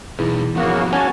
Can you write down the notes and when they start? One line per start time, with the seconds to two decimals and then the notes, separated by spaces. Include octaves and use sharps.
0.19 E2 B2 B3 D#4
0.56 C#3 F3 G3 A#3 B3 F#4
0.93 C#4 F#4 G#5 A5